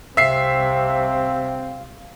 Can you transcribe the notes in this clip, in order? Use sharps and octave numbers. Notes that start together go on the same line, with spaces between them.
C2 C3 C4 E5 F5 C7